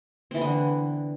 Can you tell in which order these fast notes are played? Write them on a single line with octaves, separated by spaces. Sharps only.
C4 E3 B3 D3